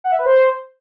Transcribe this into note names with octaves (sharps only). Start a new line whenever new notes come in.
F#5
E5
B4
C5